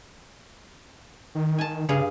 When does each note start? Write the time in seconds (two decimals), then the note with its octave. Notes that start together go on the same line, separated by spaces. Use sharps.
1.35 D#3
1.58 G#5 A5
1.89 G2 C#3 G#4 F5